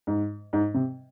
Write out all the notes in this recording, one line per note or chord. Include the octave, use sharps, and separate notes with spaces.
G#2
G#2
C3